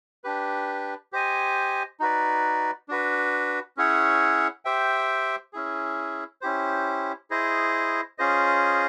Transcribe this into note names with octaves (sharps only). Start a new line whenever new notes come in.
D4 G4 B4
G4 C5 D#5 G#5
D#4 F#4 B4 D5
D4 F#4 B4
C#4 E4 G#4 C#5 F#5
G4 C5 E5 G5
C#4 E4 G#4
C#4 E4 G4 C5
E4 G#4 C5 D#5
C#4 F4 G#4 C5 D#5